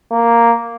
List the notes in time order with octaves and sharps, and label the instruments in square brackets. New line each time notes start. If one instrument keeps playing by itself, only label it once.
[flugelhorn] A#3